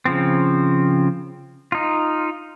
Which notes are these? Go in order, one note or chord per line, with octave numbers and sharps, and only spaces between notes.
C#3 F3 C4
D#4 F4